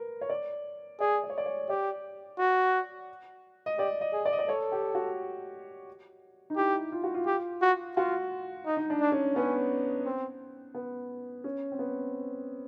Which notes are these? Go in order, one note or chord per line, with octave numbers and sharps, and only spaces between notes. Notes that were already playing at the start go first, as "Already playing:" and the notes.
Already playing: A#4 B4
C#5
D5
G#4 D5
D5
C#5
D5
C#5
G4 D5
F#4
D#5
G4 D5
D#5
G#4
D5
D#5
D5
A4 C#5
G4
F#4
D#4
E4 G4
F4
F#4
F4
G4
F#4
F4 F#4
D#4
D#4
D4
D4
C#4
B3 C#4
C4
B3
C#4
C4
B3